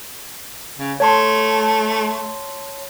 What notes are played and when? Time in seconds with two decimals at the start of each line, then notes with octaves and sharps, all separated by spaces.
0.78 C#3
1.00 A3 C#5 A5 C6